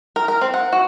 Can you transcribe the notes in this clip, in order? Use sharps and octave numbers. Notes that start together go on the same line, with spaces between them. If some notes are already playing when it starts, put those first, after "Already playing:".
A#4
A#4
C4
F#5
F#4